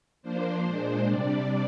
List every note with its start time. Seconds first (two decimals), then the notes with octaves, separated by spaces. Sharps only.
0.23 F3 A#3 D4 C5
0.64 A#2 G#3 D4
1.07 C3 G3 D4 D5